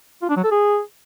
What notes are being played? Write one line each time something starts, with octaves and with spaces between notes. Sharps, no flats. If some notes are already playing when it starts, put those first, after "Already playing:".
F4
D4
F#3
A4
G#4